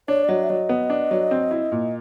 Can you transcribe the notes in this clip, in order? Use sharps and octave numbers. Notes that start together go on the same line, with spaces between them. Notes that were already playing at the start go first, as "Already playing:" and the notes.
D4 C#5
D5
F#3 D#5
E5
F#3 D#5
B3
D4
F#3
C4
E4
A#2